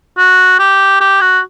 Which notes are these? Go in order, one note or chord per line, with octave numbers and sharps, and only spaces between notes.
F#4
G4
G4
F#4